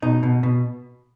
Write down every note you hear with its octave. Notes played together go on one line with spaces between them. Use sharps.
B2 D#4
B2
B2